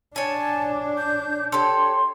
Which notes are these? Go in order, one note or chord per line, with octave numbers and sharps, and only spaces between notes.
D4 C#5 G#5 A5
G6
G4 A4 C#5 C6